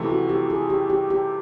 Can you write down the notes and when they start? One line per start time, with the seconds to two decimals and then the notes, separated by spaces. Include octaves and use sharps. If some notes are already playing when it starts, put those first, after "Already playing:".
Already playing: F2 C3 E3 A3
0.10 F#4
0.29 G4
0.50 G#4
0.70 G4
0.90 G4
1.10 G4